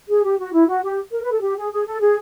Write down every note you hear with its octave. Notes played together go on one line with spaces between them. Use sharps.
G#4
G4
F#4
E4
F#4
G4
A#4
B4
A4
G4
G#4
G#4
A4
G#4